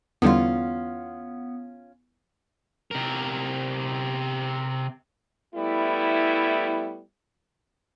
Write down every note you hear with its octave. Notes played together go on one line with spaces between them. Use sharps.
E2 D3 G3 B3 C#4 F4
C3 A#4
G3 A3 B3 E4